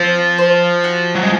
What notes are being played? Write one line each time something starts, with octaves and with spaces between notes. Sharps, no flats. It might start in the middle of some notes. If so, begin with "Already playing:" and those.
Already playing: F3 C4
C5
F#4
F#3
G#3